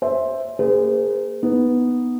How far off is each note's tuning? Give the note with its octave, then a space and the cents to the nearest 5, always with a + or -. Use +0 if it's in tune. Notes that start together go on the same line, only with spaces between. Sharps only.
C5 +10 E5 +0
A#3 -15 G#4 -20 C5 -45
B3 +0 D#4 +0